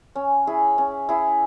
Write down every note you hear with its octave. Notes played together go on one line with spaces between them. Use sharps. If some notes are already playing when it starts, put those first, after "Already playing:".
C#4
E4 G#4
C#4
E4 G#4